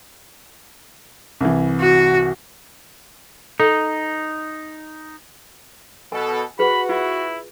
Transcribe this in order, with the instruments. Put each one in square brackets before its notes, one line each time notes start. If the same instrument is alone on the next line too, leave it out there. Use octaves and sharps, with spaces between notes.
[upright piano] C2 E3
[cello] F#4
[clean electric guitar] D#4 [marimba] A4
[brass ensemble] B2 A4 [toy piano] G#5
[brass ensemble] F#4 [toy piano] G#4 B4 [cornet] B5
[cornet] E4 [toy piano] F4